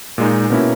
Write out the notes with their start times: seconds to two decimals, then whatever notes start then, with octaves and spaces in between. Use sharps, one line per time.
0.18 A#2 G#3 D#4
0.50 B2 A#3 C#4 E4